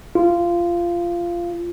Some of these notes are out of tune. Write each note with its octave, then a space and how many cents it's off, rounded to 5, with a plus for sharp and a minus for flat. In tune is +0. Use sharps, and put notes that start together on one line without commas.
F4 -15